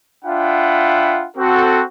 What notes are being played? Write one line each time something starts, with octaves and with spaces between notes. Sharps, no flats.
D4 F4 E5 F#5 G5 B5
C4 F#4 A4